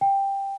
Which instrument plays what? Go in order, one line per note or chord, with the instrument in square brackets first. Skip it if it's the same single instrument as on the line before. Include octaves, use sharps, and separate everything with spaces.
[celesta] G5